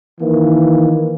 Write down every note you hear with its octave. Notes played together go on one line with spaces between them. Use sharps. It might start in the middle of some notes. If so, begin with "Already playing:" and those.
D#3 E3 A#3